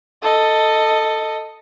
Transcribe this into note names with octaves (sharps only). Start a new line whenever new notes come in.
A4 D#5